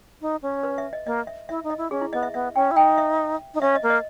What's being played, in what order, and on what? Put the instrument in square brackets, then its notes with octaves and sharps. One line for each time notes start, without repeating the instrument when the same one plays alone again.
[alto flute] D#4
C#4
[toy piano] B4
E5
D#5
[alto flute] A#3 [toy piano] D#5
[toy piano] E5
[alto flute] E4 [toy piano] E5
[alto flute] D#4
[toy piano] D#5
[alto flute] E4
[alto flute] C#4 [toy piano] G#4
[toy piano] E4
[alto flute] B3 [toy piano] D#5
[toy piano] E5
[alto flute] B3 [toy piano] E5
[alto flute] C#4 [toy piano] G5
[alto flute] E4
[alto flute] D#4 [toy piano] G5
[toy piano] E5
[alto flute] D#4
[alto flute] C#4 [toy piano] E5
[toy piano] D#5
[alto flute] A#3
[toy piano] D#5